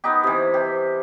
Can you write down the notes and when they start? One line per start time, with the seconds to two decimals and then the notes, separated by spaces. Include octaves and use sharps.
0.04 B3 D#4 G4
0.24 C3 E3
0.54 C3 G4